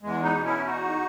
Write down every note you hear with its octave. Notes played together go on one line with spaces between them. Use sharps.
E2 G#3
B3 D#4
B2
C#4 E4
E2 D#4 F#4